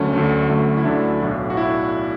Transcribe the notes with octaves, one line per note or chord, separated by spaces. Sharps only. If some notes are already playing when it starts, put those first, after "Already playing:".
Already playing: D2 D3 F#3 A3 C#4
D2 D3 F#3 A3
D2 D3 F#3 A3
E4
D2 D3 F#3 A3 D4
B1 A2 F#3
F#4
E4